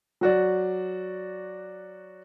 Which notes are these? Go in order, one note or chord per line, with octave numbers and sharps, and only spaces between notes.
F#3 F#4 D5